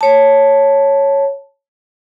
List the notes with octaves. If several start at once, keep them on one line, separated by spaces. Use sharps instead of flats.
C#5 A5